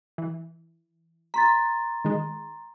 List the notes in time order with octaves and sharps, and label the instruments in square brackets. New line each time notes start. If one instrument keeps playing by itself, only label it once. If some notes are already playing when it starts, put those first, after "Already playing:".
[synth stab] E3
[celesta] A#5 C6 A6 [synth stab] B6
[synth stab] D#3 G#3